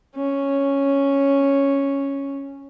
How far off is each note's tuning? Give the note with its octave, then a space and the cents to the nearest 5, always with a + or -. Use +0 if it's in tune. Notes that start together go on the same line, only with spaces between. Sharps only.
C#4 +0